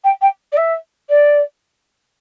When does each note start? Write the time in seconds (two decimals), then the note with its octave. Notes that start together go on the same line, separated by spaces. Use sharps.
0.04 G5
0.21 G5
0.52 D5
0.57 E5
1.09 D5